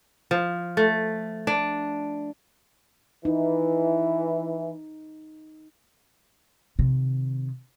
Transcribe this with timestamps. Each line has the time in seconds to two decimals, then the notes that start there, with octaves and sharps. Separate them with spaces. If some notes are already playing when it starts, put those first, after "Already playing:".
0.31 F3
0.77 A3
1.47 D4
3.25 E3 D#4
6.79 C3 D#3